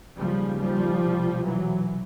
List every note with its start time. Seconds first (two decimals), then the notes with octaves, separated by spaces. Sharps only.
0.16 D#2 C#3 F3 G3
0.59 F3 G3
1.03 C2 B2
1.46 E3 F#3